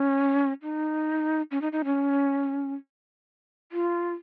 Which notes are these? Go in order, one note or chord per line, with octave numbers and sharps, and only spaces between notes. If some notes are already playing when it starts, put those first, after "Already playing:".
Already playing: C#4
D#4
C#4
D#4
D#4
C#4
F4